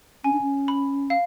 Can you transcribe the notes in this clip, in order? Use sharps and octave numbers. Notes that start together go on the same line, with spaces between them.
C#4 G#5
D4
C#4
B5
F5